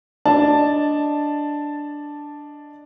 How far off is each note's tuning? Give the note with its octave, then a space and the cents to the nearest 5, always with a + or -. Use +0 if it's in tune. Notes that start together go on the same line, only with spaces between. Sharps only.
D4 +0 D#5 -5 A5 +0